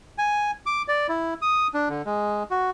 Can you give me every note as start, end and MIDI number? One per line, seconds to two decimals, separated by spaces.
0.18 0.51 80
0.66 0.82 86
0.88 1.07 74
1.09 1.34 64
1.42 1.68 87
1.74 1.89 62
1.89 2.02 50
2.06 2.43 56
2.51 2.70 66